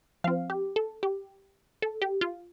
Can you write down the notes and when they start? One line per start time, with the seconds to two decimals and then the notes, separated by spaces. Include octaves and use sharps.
0.24 F3 C4 F5
0.50 G4
0.76 A4
1.03 G4
1.82 A4
2.02 G4
2.21 F4